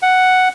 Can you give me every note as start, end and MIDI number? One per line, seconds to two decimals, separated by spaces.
0.02 0.49 78